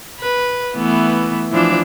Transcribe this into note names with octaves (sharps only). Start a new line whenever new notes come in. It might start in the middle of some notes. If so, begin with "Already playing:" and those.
B4
E3 A3 B3
E3 F3 D4